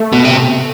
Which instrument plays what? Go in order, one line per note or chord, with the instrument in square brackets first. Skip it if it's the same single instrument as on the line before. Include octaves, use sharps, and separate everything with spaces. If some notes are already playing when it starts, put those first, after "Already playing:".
Already playing: [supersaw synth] A3
[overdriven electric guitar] B2
C3